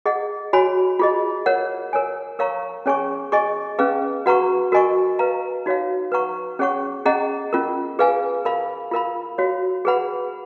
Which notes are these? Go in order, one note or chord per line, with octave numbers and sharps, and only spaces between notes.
G#4 D#5 F#5
F#4 C#5 G#5 B5
F4 G#4 D#5
A#4 C#5 F#5
A#4 C#5 G#5
A#4 C#5 F5 A#5 C#6
C#4 G#4 C#5 G#5 C#6
G#4 D#5 G#5 C#6
C#4 G#4 B4 F5
F#4 B4 F#5 A#5 C#6
F#4 A#4 D#5 G#5 C#6
B4 F5 A#5
D#4 F#4 C#5 F5
B4 F#5 A#5 C#6
C#4 G#4 C#5 F#5 C#6
C#4 G#4 D#5 F#5 A#5
C#4 F4 A#4
G#4 B4 F5 G#5
A#4 F5 B5
F4 A#4 F5 B5
F#4 C#5 F5
G#4 B4 F#5 B5